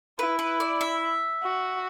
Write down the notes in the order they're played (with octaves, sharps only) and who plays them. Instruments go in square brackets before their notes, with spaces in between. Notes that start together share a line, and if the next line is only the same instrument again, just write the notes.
[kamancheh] E4 [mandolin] B4
[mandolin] B4
D5
E5
[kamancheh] F#4